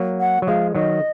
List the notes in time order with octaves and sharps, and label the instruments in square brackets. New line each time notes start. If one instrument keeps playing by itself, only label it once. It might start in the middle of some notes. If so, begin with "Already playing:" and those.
Already playing: [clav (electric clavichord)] F#3 A#3
[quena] F#5
[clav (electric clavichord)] F#3
[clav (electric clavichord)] F3 G#3 [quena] F5
[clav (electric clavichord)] D#3 F#3 [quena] D#5